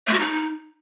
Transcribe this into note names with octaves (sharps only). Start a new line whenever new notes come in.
A3
F#4
D#4